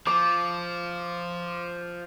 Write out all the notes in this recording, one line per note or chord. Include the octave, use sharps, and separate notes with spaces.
F3 D6